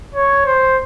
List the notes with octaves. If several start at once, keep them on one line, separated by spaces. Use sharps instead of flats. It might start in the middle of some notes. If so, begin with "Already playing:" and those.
C#5
C5